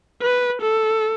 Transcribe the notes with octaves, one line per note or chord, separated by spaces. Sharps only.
B4
A4